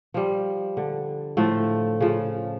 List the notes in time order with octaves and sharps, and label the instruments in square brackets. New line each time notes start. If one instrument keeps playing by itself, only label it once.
[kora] F3 G3
D3
A2 F3 A3
C#3 F3